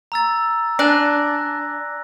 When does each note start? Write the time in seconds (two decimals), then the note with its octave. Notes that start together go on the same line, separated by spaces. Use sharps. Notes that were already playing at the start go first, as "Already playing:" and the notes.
0.12 A#5 E6 A6
0.79 D4 G#5 F#6 A#6